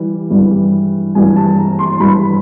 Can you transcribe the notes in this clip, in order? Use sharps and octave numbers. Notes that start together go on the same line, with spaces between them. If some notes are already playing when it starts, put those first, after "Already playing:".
Already playing: E3 G3
G2 E3 G3
G2 E3 G3 G#5
A5
A#5
C6
G2 E3 G3 B5